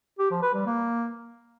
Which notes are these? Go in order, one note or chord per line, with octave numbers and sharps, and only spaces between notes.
G4
F3
B4
G3
A#3